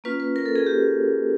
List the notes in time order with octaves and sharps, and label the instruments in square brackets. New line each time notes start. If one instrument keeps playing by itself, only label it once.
[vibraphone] A#3 C#4 F4 B4
B4
A#4
A4
G#4
G4